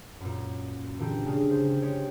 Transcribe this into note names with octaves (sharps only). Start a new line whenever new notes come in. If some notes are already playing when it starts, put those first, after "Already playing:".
F#2 A#2
A#2 D3 E3 G4
C#3 G#3 A#3 D4
G4 C5
G#3 G4 C#5